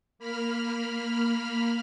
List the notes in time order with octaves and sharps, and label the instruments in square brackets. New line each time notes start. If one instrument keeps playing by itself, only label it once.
[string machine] A#3 B5 F6